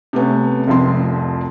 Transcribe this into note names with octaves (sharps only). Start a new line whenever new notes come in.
C3 A3 B3 C#4
F1 C2 F2 C6